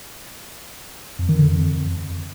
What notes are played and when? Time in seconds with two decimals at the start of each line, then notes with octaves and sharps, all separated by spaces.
1.19 F2
1.29 D#3
1.38 D3
1.48 F2